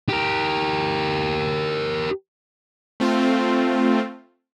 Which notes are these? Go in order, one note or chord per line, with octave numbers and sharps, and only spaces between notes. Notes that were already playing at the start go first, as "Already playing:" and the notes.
G4 A#4
A3 C4 F4